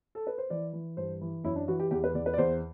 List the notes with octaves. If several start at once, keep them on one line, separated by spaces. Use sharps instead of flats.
A4
B4
C5
E3 D5
E3
G2 C5
E3
F#2 E4
D4
E3 F#4
G4
E2 G4
B4
E2 D5
B4
D5
E2 C5